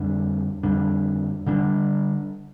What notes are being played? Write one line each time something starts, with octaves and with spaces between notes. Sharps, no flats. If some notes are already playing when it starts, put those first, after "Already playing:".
Already playing: F2 D3 G3 D4
F2 D3 G3 D4
D3 G3 D4